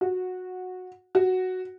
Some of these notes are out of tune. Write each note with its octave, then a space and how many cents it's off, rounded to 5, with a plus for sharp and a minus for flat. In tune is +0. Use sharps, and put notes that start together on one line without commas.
F#4 -15
F#4 +0